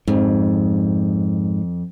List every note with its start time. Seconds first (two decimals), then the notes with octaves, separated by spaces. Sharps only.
0.08 F2 G#2